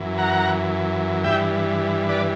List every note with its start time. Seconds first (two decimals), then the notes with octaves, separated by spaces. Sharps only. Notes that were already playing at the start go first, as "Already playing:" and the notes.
Already playing: F#2 E3
0.18 F#5 A#5
1.23 G2 E3 E5 G5
2.09 B4 D5